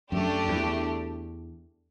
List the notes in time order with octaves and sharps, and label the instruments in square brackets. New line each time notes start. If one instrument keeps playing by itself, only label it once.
[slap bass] F#2 [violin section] A3 D4 G4
[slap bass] E2